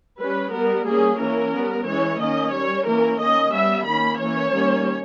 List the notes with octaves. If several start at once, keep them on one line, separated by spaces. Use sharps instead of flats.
G3 C#4 B4
G3 B3 A#4
G3 A#3 C#4 G#4
E3 A#3 C#4 A#4
G3 B3
E3 G#3 C#4 C#5
D#3 A#3 C#4 D#5
G3 C#4 C#5
E3 A#3 C#4 A#4
D#3 A#3 C#4 D#5
G3 B3 E5
D#3 A#3 C#4 B5
E3 A#3 C#4 C#5
D#3 G3 A#3 C#4